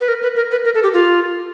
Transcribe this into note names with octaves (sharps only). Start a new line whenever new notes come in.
B4
A#4
B4
A#4
B4
A#4
A4
G4
F4